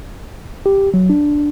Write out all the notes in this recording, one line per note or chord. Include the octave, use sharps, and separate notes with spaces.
G4
F#3
D4